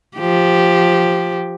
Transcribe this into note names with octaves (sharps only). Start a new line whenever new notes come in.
F3 G4